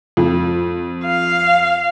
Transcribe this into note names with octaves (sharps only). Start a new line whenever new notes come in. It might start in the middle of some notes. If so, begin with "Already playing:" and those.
F2
F5